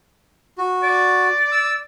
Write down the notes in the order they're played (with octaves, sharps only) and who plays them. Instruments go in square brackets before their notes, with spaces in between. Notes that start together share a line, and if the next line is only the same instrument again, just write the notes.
[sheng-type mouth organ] F#4
[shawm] D5
[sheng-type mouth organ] E6